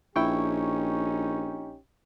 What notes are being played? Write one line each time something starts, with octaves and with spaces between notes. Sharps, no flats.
A#1 C#4 D#4 E4 G4 G5 C#6